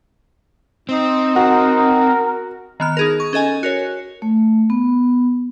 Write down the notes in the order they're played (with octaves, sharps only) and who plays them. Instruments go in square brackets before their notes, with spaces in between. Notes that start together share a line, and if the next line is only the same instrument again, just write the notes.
[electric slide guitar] C4 [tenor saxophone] D#4
[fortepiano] F#4 [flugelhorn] A#4
[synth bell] D#3 B3 F6
D#4 G#4 A#4
C#6
C#4 A4 D#5 G#5
F#4 A#4 C#5
[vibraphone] A3
B3